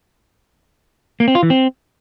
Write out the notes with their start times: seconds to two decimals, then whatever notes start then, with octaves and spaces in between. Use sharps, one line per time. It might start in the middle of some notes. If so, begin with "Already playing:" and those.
1.20 A#3
1.28 C4
1.35 F4
1.43 E3
1.50 C4